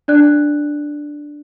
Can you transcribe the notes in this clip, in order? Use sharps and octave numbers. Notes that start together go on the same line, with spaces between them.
D4 D5 F#6